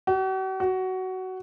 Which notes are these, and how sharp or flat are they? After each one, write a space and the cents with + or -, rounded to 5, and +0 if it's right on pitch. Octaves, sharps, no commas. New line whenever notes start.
F#4 +45
F#4 +15